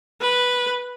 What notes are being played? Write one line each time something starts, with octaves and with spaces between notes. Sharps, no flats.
B4